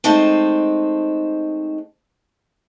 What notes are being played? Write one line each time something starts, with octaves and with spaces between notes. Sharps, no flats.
G#3 A3 C4 D#4 C5